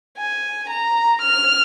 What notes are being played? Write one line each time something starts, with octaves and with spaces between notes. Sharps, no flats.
G#5
A#5
F6